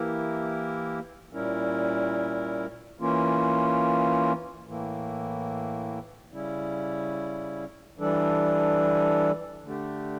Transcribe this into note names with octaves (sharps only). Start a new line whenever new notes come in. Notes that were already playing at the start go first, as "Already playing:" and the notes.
Already playing: E3 A#3 E4 G4 A#4
A#2 G3 C#4 E4 A#4
E3 A#3 C#4 F4
A2 E3 A#3
C#3 G3 C#4 E4
E3 G3 D4 A4
D3 A3 D4 G4